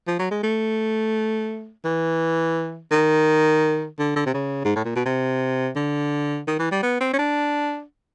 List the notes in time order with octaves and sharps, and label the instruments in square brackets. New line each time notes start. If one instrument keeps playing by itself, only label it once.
[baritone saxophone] F3
F#3
G#3
A3
E3
D#3
D3
D3
C3
C#3
G#2
A2
A#2
B2
C3
D3
D#3
E3
G3
B3
C4
C#4
D4